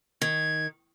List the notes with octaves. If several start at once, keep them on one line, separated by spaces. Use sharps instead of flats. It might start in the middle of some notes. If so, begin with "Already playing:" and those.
D#3 G#6